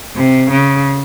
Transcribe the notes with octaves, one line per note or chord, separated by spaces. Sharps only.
C3
C#3